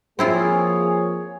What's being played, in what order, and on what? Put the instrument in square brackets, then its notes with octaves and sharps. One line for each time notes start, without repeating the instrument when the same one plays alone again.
[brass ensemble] F3 A#3 C#5 [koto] C4 E4 F4 [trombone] G#4